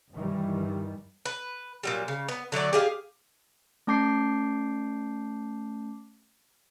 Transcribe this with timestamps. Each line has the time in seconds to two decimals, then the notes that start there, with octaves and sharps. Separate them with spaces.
0.13 G2 D#3 E3 G3
1.25 B4
1.83 A#2 F#3 G3
2.08 C#3
2.28 B3
2.52 D3 F#3 A3 D5
2.73 G4 G#4 E5 F5
3.87 A3 C#4 A5 D6 G6 C7